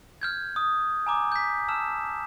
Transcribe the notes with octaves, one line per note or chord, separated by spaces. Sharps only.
F6 G6 G#6
D#6
G#5 A#5 D6
G6 B6
A5 E6 F6 E7